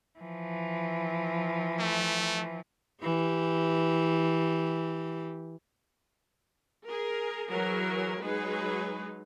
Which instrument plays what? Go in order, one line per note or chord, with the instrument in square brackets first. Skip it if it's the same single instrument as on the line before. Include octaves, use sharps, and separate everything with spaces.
[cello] E3 F3
[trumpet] A3
[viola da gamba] E3 G4
[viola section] G#4 A#4
E3 F#3 G#4 A#4
F#3 G#3 D#4 G#4 B4